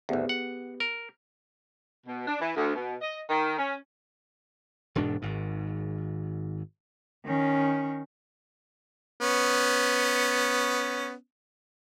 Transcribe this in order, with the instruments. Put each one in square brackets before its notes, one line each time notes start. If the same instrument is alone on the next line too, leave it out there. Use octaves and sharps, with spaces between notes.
[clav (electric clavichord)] G#1 D2 [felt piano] B3 G4 G#4
[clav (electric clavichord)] F#5
A#4
[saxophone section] B2
D4
E3
D2
B2
D#5
D#3
C#4
[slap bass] E1 G#2 B2 D4
G#1 G#2
[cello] D#3 C#4
[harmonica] B3 C#4